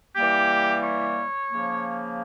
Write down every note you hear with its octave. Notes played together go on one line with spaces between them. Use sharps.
E3 G3 A#3 G4
C#5
C#3 F3 A#3